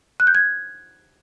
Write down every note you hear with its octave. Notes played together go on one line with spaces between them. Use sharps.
F#6
G6
G#6